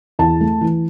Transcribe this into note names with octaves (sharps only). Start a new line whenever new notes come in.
E2 A5
A3
E3